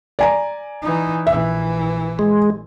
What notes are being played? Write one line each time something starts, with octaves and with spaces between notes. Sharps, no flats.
D5 G#5 A#5
E3 D#4
A#1 E3 E5
G#3